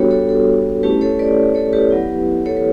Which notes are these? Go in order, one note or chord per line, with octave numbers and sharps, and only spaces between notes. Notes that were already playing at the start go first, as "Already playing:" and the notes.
Already playing: G3 B3 D4 F#4 G4 A4 B4 C#5
A4 C#5
A4 C#5
A3 C#4 E4 G4 B4
A4 C#5
B4 D5
A4 C#5
G4 B4
F#3 B3 E4
A4 C#5
B4